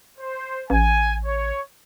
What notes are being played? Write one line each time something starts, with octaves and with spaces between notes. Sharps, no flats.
C5
A1 G#5
C#5